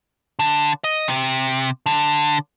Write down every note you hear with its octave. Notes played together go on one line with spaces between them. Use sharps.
D3
D#5
C3
D3